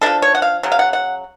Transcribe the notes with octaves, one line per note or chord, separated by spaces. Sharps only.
F3 G#3 D4 A4
C#5
F#5
F5
C#3 F#3
F5
F#5
F#5